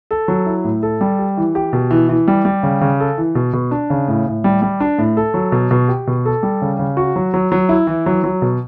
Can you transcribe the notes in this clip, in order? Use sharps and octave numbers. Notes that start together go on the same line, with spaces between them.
A4
F#3
E4
A2
A4
G3
G4
E3
G4
B2
E3
E3
G3
G3
C#3
C#3
A4
E3
B2
B2
D4
C#3
A2
A2
G3
G3
D4
A2
A4
F#3
B2
B2
G4
B2
A4
G3
C#3
C#3
F#4
F#3
F#3
F#3
E4
E3
F#3
F#3
B2